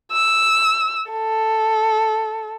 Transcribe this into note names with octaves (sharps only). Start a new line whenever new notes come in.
E6
A4